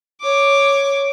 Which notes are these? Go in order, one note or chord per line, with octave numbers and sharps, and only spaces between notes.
C#5 D6